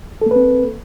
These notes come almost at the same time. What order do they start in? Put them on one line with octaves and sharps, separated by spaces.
A4 A#3 B4 C4